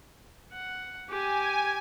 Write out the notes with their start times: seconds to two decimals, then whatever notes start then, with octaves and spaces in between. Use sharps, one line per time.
0.52 F#5
1.09 G4 G#5